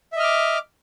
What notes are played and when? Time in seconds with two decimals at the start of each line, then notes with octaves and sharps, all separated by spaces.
0.12 E5
0.16 D#5
0.20 F6
0.23 D6